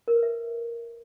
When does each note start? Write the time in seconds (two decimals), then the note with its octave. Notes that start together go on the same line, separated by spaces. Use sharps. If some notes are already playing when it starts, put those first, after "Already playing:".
0.08 A#4
0.15 B4
0.23 E5